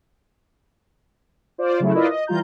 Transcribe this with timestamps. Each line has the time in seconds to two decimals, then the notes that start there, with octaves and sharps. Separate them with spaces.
1.58 F4 C5 D5
1.80 C#3 F#3 A3 E4
1.95 E4 F4 A#4 B4 D5 D#5
2.10 D#5
2.27 E3 G3 F4 A#5 G6